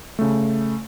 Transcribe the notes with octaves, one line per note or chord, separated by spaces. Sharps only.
C#3 A3